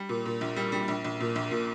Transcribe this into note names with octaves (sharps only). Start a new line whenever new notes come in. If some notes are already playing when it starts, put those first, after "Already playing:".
Already playing: G3
A#2
A#2
A#1
G3
G3
A#1
A#1
A#2
A#1
A#2